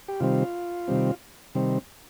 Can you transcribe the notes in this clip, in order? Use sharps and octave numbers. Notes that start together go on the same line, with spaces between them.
G4
C3 D#3 G3 C4 F4
C3 D#3 G3 C4
C3 D#3 G3 C4